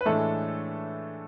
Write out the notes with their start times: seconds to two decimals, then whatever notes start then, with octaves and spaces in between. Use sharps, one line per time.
0.01 B4
0.06 A2 E3 G#3 A3 D4 A4